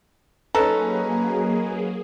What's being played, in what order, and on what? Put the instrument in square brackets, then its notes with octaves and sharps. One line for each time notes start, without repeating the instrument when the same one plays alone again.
[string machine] F#3 A#3 G#4 [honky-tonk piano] C#4 D#4 B4 [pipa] A4 [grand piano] A#5